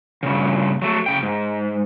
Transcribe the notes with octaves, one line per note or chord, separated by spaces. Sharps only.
G2 A#2 C#3
F#3 A3
C#3 G5
G#2